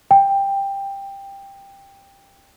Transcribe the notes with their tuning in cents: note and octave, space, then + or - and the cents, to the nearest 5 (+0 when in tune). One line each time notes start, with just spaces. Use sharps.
G5 +10